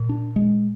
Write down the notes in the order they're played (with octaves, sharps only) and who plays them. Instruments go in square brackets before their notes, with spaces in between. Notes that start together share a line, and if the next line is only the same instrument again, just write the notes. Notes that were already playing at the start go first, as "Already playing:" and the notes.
Already playing: [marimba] A#2
[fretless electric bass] D4
G#3